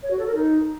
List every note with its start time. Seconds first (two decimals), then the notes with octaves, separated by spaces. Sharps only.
0.03 C#5
0.11 F#4
0.19 A4
0.27 A#4
0.35 D#4